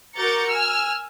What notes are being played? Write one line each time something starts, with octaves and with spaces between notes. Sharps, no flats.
F#4 A#4 D6 G6 A6 C#7
G#5 E6 F6